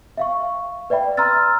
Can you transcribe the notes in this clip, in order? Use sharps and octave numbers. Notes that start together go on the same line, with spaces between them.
E5 F5 C#6
B4 D5 E5 G5 B5
A#5 C6 E6 F6 A6